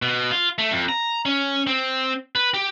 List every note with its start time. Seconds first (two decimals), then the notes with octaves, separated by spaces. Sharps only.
0.02 B2
0.31 F4
0.58 A3
0.71 F2
0.89 A#5
1.26 C#4
1.67 C4
2.35 B4
2.54 G4